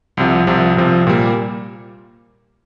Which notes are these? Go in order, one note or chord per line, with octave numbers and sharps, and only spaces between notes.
C2 C3 F3
C2 C3 F3
C2 C3 F3
A#2 G3 A#3